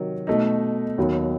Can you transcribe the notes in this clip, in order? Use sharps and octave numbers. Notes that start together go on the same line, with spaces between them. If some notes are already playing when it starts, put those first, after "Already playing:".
Already playing: C3 D#3 F#3
B2 A3 D#4
D#2 D#3 F#3 B3